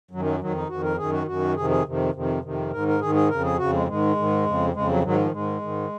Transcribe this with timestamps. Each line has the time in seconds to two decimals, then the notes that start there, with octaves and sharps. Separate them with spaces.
0.11 F#2 D#3 F#3
0.25 F#3
0.40 F2 D#3 F#3
0.55 D#4
0.69 F2 D#3 F#4
0.83 A#4
0.98 F#2 D#3 G#4
1.12 F#4
1.26 F#2 D#3 F#4
1.55 F2 C3 D#3 G#4
1.70 G#4
1.85 F2 C3 D#3
2.13 F2 C3 D#3
2.43 F2 C3 D#3
2.71 G#2 D#3 A#4
2.88 A#4
3.00 G#2 D#3 G#4
3.15 G#4
3.29 F2 C#3 A#4
3.44 G#4
3.58 F2 C#3 F#4
3.73 G#3
3.87 G#2 D#3 G#3
4.16 G#2 D#3
4.45 F2 C#3
4.74 F2 C#3 G#3
4.89 F#3
5.03 G#2 D#3 F#3
5.17 F3
5.31 G#2 D#3 G#3
5.61 G#2 D#3